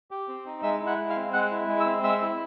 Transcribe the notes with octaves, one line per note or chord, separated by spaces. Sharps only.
G4
C4
D#4
G#3 E5 E6
E4
F#5 F#6
G#3
F5 F6
C4
G#3 F#5 F#6
E4
G#3
E5 E6
C4
G#3 E5 E6
E4